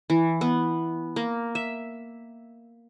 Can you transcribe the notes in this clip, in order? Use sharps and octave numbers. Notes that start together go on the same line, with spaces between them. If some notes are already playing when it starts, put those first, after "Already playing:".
E3
B3
A#3
E5